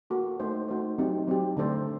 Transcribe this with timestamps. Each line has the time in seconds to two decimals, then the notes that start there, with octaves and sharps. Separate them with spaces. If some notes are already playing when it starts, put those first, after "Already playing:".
0.10 A#3 F#4 A4
0.40 A3 D#4 F#4 C5
0.68 A3 D#4 F#4 C5
0.98 F#3 C4 D#4 G4
1.27 F#3 C4 D#4 G4
1.57 D3 A3 D4 A4 C5